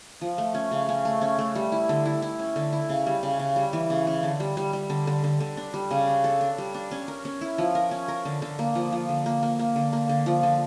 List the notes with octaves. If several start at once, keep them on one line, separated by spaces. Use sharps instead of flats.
F3
A3
C#4
C#3
C#4
A3
C#4
A3
G3
E4
D3
E4
E4
C#4
D3
E4
C#3
G3
C#3
C#3
G3
E3
C#3
C#3
D3
G3
G3
G3
D3
D3
D3
D3
D4
G3
C#3
D4
A4
D4
G3
D4
C#4
A#4
C#4
E4
F3
A#4
C#4
A#4
D3
D3
A#3
F3
F3
D3
A#3
A#3
A#3
D3
A#3
D3
F3
D3